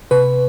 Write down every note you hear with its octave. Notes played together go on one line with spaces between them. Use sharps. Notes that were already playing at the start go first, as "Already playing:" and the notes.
C3 B4